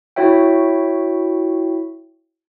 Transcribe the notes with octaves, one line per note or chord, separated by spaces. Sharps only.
E4 F#4 C#5 E5 G5